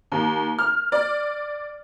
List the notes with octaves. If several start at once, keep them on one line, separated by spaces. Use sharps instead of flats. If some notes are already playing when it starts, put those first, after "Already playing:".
D#2
F6
D5